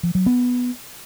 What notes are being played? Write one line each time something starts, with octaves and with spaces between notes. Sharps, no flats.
F3
F#3
B3